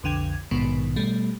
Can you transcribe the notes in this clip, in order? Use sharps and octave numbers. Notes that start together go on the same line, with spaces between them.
B1 F2 D3 G5 G#6
A#1 G#2 B2 D#3 B3
B2 G3 A3